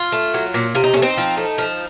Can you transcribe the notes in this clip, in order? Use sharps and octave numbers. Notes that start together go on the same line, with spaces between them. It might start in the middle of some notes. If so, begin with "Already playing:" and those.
Already playing: F4
A3
F#3
A#2
C3 F4
D#4
C#4
A3
C4 D#4
F3
A3
F3